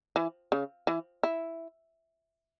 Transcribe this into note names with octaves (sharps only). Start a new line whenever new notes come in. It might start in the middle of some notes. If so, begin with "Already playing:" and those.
E3
C#3
E3
E4